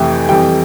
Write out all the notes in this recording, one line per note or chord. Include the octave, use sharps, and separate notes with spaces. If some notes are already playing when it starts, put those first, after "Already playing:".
Already playing: F2 C3 E3 A3 G5
F2 E3 G3 G5